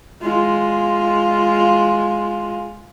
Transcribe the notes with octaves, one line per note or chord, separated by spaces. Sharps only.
G#3 F4